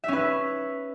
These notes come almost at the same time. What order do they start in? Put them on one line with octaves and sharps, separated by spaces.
E5 C#4 B4